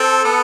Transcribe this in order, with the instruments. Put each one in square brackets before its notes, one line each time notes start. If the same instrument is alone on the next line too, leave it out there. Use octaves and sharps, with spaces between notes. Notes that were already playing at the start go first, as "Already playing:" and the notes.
Already playing: [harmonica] C4 [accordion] A4
[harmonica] B3